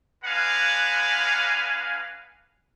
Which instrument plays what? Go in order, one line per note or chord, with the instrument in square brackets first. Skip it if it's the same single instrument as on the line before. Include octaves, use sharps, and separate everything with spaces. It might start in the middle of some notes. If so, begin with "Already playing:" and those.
[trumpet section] G#3 D4 B4 F5 F#5 G#5